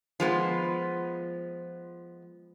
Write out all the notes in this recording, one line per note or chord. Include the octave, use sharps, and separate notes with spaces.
F3 G#3 B3